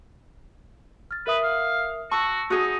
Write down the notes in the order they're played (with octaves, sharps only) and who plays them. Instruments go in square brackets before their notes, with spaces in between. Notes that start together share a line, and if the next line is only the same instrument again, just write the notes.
[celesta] F6 A6
[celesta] A#4 E5 D#6 [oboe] B4
[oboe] F5
[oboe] F#4 [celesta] A5 E6 [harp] C#6
[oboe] D#4 [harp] F#4 G#4